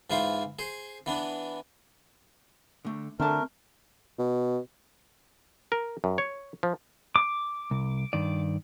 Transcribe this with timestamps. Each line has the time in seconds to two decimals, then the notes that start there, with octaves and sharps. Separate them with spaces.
0.10 G#2 E3 E4 F4 C5
0.59 G#4 C5
1.06 E3 B3 D4
2.85 D3 A3
3.20 D3 A3 C4 A#4 A5
4.19 B2
5.72 A#4
6.04 F#2
6.18 C#5
6.63 F3
7.16 D6
7.71 C2
8.13 G2 D#3 D5